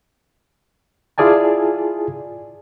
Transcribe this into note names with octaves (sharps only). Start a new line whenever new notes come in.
E4 F4 G#4 D5 G#5 A5